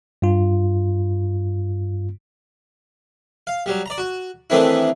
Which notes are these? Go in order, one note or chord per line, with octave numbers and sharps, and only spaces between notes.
G2 F4
F5
F#3 G3
D5 A#5
F#4
D#3 E3 A3 C4 D4 E4